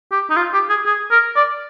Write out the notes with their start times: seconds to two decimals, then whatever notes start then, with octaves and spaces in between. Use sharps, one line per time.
0.12 G4
0.30 D#4
0.37 F4
0.54 G4
0.69 G#4
0.86 G#4
1.11 A#4
1.36 D5